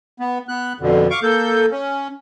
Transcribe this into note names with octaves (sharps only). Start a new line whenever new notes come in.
B3
B3 F#6
F2 B2 D3
F5 C#6 D6
A#3 A4 G6
C#4